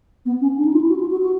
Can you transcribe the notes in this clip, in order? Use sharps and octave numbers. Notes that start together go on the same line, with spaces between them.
B3
C#4
D4
D#4
F4
E4
F#4
F4
F#4
F#4